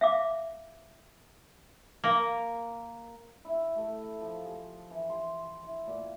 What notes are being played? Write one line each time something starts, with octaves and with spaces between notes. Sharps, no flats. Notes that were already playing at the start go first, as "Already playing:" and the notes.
E5 F5 D6
A#3 A#4
E4
A3
F3
G#4
E3
C6
E4
A#2